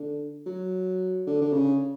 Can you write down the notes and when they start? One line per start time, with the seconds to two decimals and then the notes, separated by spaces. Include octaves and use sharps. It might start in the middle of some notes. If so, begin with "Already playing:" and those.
Already playing: D3
0.46 F#3
1.27 D3
1.42 D3
1.53 C#3